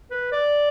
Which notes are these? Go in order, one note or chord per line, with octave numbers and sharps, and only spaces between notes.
B4
D5